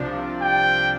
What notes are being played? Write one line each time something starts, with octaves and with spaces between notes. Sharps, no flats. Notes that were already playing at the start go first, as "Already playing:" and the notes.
Already playing: C2 C3 F3 D4
G5